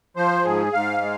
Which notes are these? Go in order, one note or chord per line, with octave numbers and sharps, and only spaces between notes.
F3 C5
G#2 G#4
G#2 F5
G#3